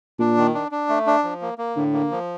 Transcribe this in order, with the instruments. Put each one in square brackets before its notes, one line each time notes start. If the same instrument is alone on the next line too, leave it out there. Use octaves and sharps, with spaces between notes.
[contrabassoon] A#2 [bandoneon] D4
[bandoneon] D#3
D4
D4
A3
D4
F3
A#3
A#3
[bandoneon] A2 [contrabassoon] D3
[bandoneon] A#3
F3